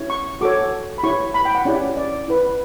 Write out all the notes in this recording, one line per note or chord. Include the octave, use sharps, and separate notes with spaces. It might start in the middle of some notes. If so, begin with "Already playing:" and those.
Already playing: C#4 E4 G4 C#5
C#6
F#4 A4 C#5 D6
B5
E4 G4 C#5 C#6
B5
G5
F#5
C#4 E4 G4 C#5 D5
D5
E4 B4